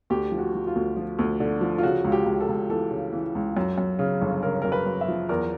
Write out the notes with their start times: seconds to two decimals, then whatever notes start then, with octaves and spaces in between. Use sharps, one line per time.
0.10 D2 G4
0.32 F3
0.38 F#4
0.54 F3
0.67 F4
0.75 D2
0.97 F3
1.19 D2
1.40 D3
1.61 F3
1.78 F4
1.83 C#3 F#4
2.05 C#2
2.12 G4
2.26 C#2
2.41 A4
2.49 C#2
2.69 E3 A4
2.91 C#3
3.13 E3
3.35 C#2
3.57 F#2
3.78 F#2
3.99 C#3
4.22 G1
4.43 C#3 A#4
4.62 F#2 A#4
4.72 B4
4.86 F#2
5.01 E5
5.08 F3
5.29 E2 A#4